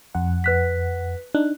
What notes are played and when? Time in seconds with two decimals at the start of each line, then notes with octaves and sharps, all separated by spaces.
0.15 F2 F#5
0.44 B4 F#6 B6
1.35 D4 D#4 F#6